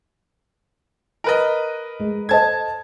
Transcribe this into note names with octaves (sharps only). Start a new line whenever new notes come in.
A#4 B4 D#5
G#3
A4 C5 D#5 A5 G#6